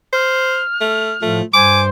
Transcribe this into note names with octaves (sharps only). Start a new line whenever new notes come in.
C5 F6
A3
A2 F3 A3
G2 C5 G#5 D6